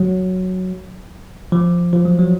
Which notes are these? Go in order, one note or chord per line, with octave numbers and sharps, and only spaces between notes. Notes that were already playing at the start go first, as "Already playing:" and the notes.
Already playing: F#3
F3
F3
F#3
F#3